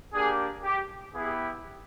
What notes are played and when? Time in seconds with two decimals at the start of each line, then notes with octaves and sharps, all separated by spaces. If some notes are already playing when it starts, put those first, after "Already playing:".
0.12 A#3 D4 G4 G#4
0.63 G4
1.14 B3 E4 G4 G#4